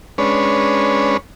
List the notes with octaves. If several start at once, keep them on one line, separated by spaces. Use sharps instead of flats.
G#3 C#4 D4 B4 C#5